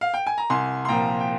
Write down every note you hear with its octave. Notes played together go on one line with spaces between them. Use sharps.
F5
G5
G#5
A#5
C2 G#5 C6
C6
A#2 F3 G5 A#5
G5